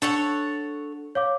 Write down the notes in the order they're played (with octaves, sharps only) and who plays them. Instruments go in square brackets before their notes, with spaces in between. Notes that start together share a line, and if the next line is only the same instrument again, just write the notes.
[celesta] D4 [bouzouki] A4 C#5 F#5
[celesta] C#5 F5 D6